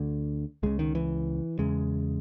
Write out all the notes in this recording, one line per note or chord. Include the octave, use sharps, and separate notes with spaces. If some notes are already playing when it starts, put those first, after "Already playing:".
Already playing: D2 D3
C#2 C#3 G#3
D#3
E3
E2 C#3 G#3